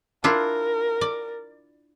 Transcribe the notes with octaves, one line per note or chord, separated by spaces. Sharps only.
D4 E4 F4 A#4
D5